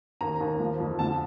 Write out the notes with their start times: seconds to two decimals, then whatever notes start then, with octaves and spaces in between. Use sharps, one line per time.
0.21 D#2 A#5
0.41 D#2
0.60 F3
0.80 F2
0.99 D3 A5